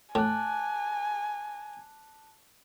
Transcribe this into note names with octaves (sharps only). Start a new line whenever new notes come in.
A2 G#5 A5 D6 F#6